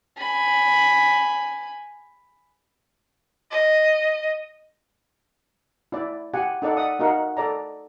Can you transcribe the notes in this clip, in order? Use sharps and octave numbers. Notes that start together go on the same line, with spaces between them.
G#5 B5
D#5
E4 D5
G4 F#5 G#5
D#4 A4 D5 F#5
D5 E5 F#5 D#6
D#4 F#4 A#4 F5 F#5
A4 D5 A#5